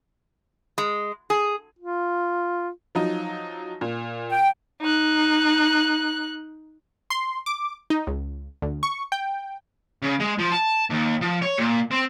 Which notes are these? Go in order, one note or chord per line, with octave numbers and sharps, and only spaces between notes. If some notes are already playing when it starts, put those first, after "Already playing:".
G#3
G#4
F4
F3 F#3 D#4
A#2
G5
D#4 F#6
C6
D6
D#4
C#2
D2
C#6
G5
C#3
G#3
F3
A5
D#2
F3
C#5
A#2
C4